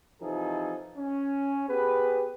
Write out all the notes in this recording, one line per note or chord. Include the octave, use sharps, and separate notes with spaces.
C3 E3 F3 D#4 G#4 A4
C#4
B3 G4 G#4 B4